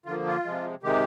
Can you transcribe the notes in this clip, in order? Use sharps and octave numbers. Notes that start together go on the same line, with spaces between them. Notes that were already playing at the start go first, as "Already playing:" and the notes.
D3 F3 A#3 F4
F4
C3 F3 G#3
C3 D#3 G#3 G4